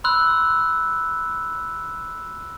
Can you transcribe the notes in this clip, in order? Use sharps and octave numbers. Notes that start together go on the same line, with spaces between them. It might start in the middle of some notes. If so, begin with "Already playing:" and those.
B5 C6 E6 F#6